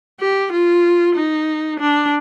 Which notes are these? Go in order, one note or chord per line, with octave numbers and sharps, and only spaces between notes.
G4
F4
D#4
D4